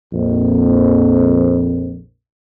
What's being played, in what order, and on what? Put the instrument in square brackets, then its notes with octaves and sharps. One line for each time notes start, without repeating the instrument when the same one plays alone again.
[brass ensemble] A#1 F2